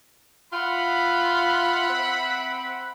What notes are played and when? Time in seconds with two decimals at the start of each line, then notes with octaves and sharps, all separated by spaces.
0.53 F4 E5 F#5 B5
1.89 C4